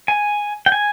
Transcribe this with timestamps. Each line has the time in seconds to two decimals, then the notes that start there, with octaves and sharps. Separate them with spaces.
0.08 G#5
0.66 G5
0.72 G#5